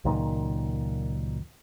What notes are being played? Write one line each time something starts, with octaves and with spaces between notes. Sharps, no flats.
C#2 F#2 A#2 D#3